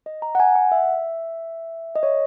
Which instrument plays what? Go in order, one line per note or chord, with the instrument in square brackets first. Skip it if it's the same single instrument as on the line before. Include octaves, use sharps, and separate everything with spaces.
[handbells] D#5
A#5
F#5
G#5
F#5
E5
D#5
C#5